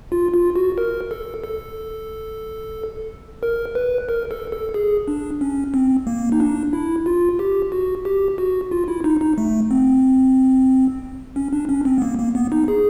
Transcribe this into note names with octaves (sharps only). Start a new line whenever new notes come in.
F4
F4
F#4
A#4
A4
A4
A#4
B4
A#4
A4
A4
G#4
D4
C#4
C4
A#3
D#4
D4
E4
F4
G4
F#4
G4
F#4
F4
E4
D#4
D#4
A3
C4
C#4
D4
C#4
C4
B3
A#3
A#3
B3
D#4
G#4